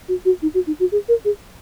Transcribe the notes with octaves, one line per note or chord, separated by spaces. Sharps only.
F#4
F#4
D#4
F#4
D#4
F#4
G#4
A#4
G#4